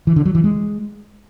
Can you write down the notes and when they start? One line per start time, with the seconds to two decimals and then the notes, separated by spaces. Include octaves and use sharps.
0.07 E3
0.16 D3
0.26 F#3
0.35 E3
0.44 G#3